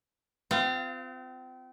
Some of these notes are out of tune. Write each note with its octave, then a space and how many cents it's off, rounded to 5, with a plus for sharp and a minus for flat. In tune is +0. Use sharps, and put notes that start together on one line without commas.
C4 -35 F4 +0 F5 -25